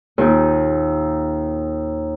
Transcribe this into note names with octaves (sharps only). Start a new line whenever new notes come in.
D#2 A#2 G6